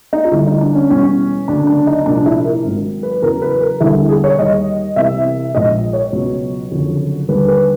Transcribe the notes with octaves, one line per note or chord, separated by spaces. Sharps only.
D#4
F4
D2 D3 G3 E4
D#4
D4
C#4
E2 B2 G3 C#4
D2 C#3 F#3 D4
D4
D#4
C2 A#2 F3 D4
E4
A#4
G#1 G#2 D#3 F#3
B4
E2 C#3 F#3 A#4
B4
A#4
E1 D#2 D3 G3 E4
G#4
C#5
D#2 D#3 G3 D#5
C2 C3 E3 E5
A#1 G#2 F3 D#5
C#5
C#2 B2 F#3
F#1 F2 D3 F#3
D#2 D3 G3 B4
B4